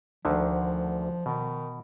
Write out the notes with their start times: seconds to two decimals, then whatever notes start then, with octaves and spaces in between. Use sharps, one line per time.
0.25 D2 D3 D#3 F3
1.26 B2 D#3